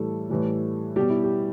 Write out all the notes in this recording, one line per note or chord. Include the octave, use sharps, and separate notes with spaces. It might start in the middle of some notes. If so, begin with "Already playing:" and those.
Already playing: A2 E3 G3 A4
A2 E3 G3
B2 G3 G4
E4
G4